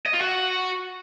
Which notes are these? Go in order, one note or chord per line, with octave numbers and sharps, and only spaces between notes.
D#5
F4
F#4